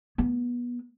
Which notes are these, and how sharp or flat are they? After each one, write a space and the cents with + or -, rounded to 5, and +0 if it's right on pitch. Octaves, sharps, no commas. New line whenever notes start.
B3 -25